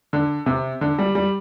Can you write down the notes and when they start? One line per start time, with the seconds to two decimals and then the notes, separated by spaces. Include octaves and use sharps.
0.13 D3
0.46 C3
0.81 D3
0.99 G3
1.15 G3